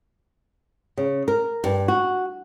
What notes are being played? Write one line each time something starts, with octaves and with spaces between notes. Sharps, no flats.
C#3
A#4
G2
F#4